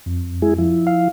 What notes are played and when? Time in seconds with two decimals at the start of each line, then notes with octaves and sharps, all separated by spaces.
0.06 F2
0.42 G#3 E4 G#4
0.58 F3 E4
0.87 F5